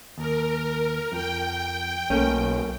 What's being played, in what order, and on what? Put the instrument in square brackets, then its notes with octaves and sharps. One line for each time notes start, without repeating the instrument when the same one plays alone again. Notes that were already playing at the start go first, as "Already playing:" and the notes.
[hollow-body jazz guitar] D#2 [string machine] A#4
[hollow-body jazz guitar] F2 [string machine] G5
[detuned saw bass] B1 [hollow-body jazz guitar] A3 A#3 C#4